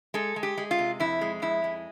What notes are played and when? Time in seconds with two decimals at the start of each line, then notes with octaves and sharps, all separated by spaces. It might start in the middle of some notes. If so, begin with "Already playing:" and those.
0.14 G#3 A4
0.36 G#3
0.43 G4
0.58 G#3
0.71 F4
0.79 C3
1.00 F2 E4
1.21 G#3
1.42 F2 E4
1.64 G#3